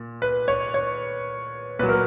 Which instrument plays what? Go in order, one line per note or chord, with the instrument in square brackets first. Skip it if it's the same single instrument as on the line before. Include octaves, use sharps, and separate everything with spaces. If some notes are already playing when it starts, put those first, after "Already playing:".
Already playing: [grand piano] A#2
B4
C#5
C#5
A#2 F#3 B4
A#4